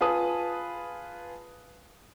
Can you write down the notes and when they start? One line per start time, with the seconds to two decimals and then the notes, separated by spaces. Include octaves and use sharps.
0.01 F4 G#4 B4 A5 D#6